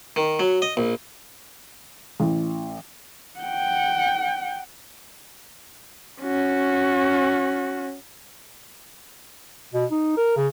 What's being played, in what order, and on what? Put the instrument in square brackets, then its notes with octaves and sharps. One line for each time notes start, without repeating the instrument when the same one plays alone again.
[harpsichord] D#3
F#3
D#5
A#1
[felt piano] A1
[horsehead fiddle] F#5 G5
C#4 F#4
[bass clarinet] B2
D#4
A#4
C#3